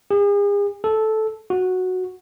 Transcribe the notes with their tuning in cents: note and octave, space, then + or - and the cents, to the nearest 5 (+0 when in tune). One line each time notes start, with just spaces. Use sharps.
G#4 -40
A4 -10
F#4 -5